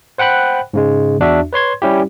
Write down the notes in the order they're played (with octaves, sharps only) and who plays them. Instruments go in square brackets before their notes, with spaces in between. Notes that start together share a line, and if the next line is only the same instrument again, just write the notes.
[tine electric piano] C5 F#5 G5 B5 F#6
G#2 C#3 G#3
E2 D4 F#4 E5
B4 C#5 C6 G#6
G3 C#4 E4 G4